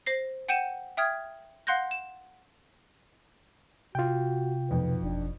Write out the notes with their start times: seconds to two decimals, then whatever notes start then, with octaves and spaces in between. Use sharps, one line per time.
0.06 C5 A#6 C7
0.48 F#5 G5 G6 C#7 D#7 E7
0.97 E5 G5 D#6 F6 G#6
1.67 F5 F#5 C6 F#6 G6 A#6
1.91 E7
3.95 C3 F4 F#4 G5
4.71 B1 F2 B4
5.03 F#1 D4